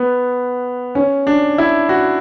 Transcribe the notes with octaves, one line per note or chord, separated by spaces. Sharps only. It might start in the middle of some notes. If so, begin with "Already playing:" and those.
Already playing: B3
C#4
D4
E4
F#4